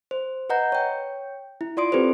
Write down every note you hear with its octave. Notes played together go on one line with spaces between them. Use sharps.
C5
B4 D#5 F#5 A#5 G6
C#5 G5
E4
F4 D5 C6 D#6 D7
C4 G4 A4 B4 C5